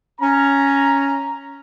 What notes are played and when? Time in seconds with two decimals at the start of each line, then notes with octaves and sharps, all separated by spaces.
0.20 C#4 A#5